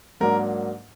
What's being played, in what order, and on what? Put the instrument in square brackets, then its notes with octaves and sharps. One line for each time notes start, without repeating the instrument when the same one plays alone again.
[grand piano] G#2 F#3 A#3 D4 A#4